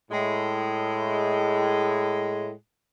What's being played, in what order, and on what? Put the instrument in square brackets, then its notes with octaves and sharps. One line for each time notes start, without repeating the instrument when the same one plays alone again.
[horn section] A2 G#3